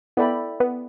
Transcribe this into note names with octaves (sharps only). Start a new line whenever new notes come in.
B3 E4 A4 D5 G5 B5
B3